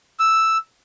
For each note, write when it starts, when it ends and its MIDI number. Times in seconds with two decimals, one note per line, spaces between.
0.19 0.58 88